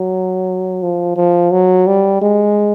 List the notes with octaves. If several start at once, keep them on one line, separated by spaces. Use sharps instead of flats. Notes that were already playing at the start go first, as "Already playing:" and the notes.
Already playing: F#3
F3
F3
F#3
G3
G#3